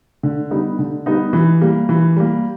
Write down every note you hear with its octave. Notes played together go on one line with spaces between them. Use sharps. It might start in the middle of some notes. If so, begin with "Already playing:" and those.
D3
G3 B3 D#4
D3
G3 B3 D#4
E3
G3 A#3
E3
G3 A#3